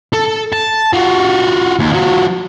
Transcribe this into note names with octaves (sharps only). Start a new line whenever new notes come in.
A4
A5
F4 F#4
D#2
F3 F#4